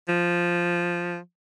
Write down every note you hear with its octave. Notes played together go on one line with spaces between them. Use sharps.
F3